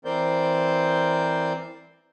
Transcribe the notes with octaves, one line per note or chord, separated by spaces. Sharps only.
E3 C4 A#4 C5 D5 G6